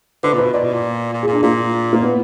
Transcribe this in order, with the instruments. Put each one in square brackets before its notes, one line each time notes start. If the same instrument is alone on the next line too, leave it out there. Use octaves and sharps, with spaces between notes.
[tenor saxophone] D3 [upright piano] B4
[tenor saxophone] A#2
[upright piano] B4
[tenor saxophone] B2
[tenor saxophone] A#2 [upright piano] D5
[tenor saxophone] B2
A#2
A#2
[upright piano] G#4
[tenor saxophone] A#2 [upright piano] D4
[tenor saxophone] A#2 [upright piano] A#3
[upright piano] A#3
B3